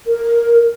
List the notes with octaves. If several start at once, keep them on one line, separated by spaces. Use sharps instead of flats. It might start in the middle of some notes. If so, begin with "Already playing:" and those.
A#4